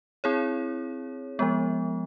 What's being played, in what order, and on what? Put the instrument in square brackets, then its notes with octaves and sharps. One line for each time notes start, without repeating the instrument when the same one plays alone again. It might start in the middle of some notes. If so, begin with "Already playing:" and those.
[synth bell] C4 E4 G#4 C#5
F3 G#3 B3